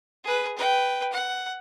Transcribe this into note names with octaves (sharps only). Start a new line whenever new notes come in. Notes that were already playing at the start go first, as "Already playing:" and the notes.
G#4 B4
B4 G5
F#5